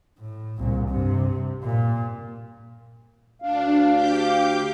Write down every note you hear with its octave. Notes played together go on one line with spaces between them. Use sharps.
A2
C2 A#2
G2 C3
A#2
D2 D4 F5
G4 D6 G6